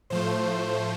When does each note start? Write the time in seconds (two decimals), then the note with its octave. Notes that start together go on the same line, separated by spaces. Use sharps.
0.10 A2 F3 A3 C5